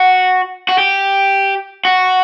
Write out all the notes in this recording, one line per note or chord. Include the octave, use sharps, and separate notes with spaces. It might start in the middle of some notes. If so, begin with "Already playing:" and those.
Already playing: F#4
F#4
G4
F#4